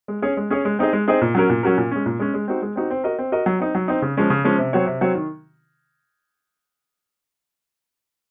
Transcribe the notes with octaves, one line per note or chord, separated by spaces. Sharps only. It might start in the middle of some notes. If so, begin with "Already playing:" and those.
G#3
C#4 G#4 C#5
G#3
C#4 G#4 C#5
G#3
C4 D#4 G#4 D#5
G#3
C4 D#4 G#4 D#5
A#2
F#3 C#4 F#4 A#4
A#2
F#3 C#4 F#4 A#4
A#2
G#3 C#4
A#2
G#3 C#4
G#3
C4 D#4 F#4
G#3
C4 D#4 F#4
C4
F#4 A#4 D#5
C4
F#4 A#4 D#5
F#3
C4 D#4
F#3
C4 D#4
C#3
F3 G#3 C#4
C#3
F3 G#3 C#4
C3
F#3 C4 F#4 C#5
C3
F#3 C4 F#4 C#5
D#3